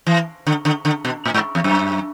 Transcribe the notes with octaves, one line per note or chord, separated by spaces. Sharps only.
E3
D3
D3
D3
B2
A2
G#2
E2
F#2